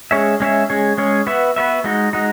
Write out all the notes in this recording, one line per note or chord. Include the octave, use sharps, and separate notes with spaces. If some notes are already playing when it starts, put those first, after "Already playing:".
G#3 C#4 G#4 C#5 E5
G#3 C#4 G#4 C#5 E5
G#3 C#4 G#4 C#5
G#3 C#4 G#4 C#5
B3 F#4 B4 E5
B3 F#4 B4 E5
G#3 D#4 F#4
G#3 D#4 F#4